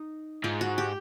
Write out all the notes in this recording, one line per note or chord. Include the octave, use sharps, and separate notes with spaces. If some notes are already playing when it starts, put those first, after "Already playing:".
Already playing: D#4
G#2 F4
F#4
G4